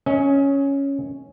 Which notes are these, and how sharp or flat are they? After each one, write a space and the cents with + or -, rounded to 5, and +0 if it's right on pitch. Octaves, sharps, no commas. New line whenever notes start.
C#4 +0 D#5 +35